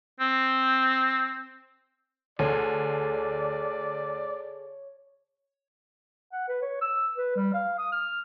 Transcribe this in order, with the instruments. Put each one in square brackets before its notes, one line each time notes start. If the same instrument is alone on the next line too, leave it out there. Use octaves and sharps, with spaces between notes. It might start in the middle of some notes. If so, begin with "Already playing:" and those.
[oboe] C4
[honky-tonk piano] D2 [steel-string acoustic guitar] G#4 A4 [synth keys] C#5 [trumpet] D5
[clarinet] F#5
B4
C#5
E6
B4
G3
F5
D#6
F6